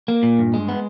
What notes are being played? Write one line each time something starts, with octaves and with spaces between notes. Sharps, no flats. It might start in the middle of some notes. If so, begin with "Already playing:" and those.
A#3
A#2
G2
G#3
B3